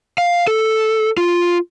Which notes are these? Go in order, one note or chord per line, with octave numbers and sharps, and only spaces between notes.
F5
A4
F4